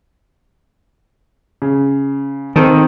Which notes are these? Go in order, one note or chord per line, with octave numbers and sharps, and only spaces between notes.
C#3
D#3 C4 A4 A#4